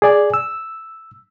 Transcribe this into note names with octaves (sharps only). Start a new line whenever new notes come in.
G#4 D5 G#5
E6